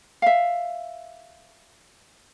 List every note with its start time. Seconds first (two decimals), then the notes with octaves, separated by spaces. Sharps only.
0.22 E5 F5